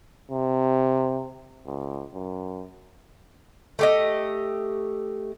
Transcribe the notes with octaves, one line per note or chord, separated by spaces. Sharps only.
C3
C#2
F#2
A3 G4 D#5